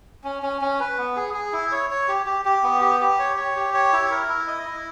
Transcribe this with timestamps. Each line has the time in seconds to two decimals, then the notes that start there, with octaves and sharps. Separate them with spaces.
0.24 C#4
0.43 C#4
0.62 C#4
0.80 B4
0.98 B3
1.16 G#4
1.34 G#4
1.53 E4
1.72 C#5
1.90 C#5
2.08 G4
2.26 G4
2.45 G4
2.63 B3
2.81 G4
3.01 G4
3.19 C#5
3.37 C#5
3.56 G4
3.74 C#5
3.93 E4
4.11 A#4
4.29 E4
4.47 D#5
4.66 E4